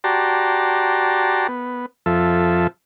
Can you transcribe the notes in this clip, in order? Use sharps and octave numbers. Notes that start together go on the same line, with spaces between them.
F#4 G4 D5 A5 A#5 C6
B3
F2 F3 A4 E5